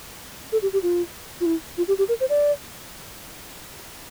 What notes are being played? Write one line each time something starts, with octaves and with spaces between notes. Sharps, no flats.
A4
G4
G4
F4
F4
E4
F4
G4
G4
A#4
C5
D5